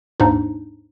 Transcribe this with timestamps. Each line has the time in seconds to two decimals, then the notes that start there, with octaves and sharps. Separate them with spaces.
0.20 D#2 G#2 D4 D#4